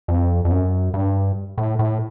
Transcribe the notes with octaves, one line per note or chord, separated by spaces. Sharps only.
F2
F2
F#2
G2
A2
A2